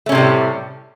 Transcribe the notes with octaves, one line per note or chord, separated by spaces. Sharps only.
A2 C3 G3 A3 C#4